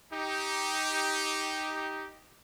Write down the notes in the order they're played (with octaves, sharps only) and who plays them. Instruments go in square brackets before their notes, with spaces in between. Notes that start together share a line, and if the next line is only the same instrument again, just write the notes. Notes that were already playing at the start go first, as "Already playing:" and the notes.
[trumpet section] D#4 G4